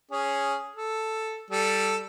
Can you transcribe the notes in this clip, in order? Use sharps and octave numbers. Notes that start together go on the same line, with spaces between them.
C#4 G#4
A4
G3 A4